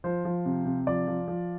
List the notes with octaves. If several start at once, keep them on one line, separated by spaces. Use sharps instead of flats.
F3 C5
F3
C3
C3
F3 D5
F3
F3